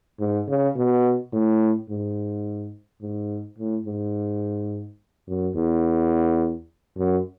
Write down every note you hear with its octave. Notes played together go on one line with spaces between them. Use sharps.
G#2
C#3
B2
A2
G#2
G#2
A2
G#2
F#2
E2
F#2